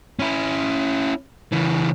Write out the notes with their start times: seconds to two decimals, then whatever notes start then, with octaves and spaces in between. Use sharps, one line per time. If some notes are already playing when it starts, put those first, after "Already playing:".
0.19 C#4 E4
1.52 C#3 E3